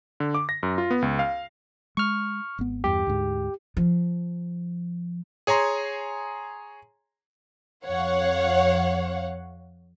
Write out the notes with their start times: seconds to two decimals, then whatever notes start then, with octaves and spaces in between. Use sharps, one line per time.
0.20 D3
0.34 D6
0.49 A#6
0.63 F#2
0.78 F4
0.91 B3
1.02 C#2
1.19 F5
1.97 G#3 C#6 F6
2.59 G#1 B3
2.84 E2 G2 G4
3.07 D2 G#2
3.77 F3
5.47 G#4 C#5 G#5 A#5 C6
7.85 F2 C#5 F5 F#5